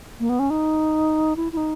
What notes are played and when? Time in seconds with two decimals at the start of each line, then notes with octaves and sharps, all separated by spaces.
0.20 A#3
0.29 B3
0.39 C#4
0.50 D#4
1.36 E4
1.52 E4
1.57 D#4